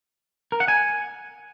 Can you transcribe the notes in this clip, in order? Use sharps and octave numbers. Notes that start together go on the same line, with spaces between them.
A#4
F#5
G#5